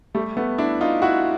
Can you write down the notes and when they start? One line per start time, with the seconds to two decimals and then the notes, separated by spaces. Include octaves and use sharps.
0.15 G3 A3
0.37 A3 B3
0.58 D4 E4
0.81 D#4 F4
1.02 E4 F#4